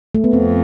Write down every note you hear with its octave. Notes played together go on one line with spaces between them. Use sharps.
A3
B3
F2 C4